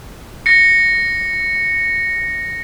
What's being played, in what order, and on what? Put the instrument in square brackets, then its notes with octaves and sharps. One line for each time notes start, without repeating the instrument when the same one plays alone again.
[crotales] A#6 C#7